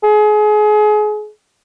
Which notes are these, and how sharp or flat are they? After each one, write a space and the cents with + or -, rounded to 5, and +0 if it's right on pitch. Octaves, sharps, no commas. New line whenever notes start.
G#4 +30